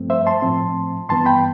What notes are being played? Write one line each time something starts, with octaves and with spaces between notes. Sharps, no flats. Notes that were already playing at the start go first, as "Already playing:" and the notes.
Already playing: G2 F3 A3 C4
C5 E5
A5 C6
A2 F3 C4
G2 E3 B3 A5 C6
G5 B5